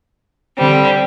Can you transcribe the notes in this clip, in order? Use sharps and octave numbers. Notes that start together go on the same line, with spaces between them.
D3 G3 C4